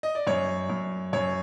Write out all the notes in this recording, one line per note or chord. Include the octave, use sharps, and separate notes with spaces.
D#5
D5
F#2 C#5
F#2
F#2 C#5